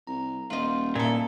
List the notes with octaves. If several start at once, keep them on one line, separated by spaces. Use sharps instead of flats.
C2 A#5
D#1 D#4 F4 F5
A#2 A#3 E4 A4 C#7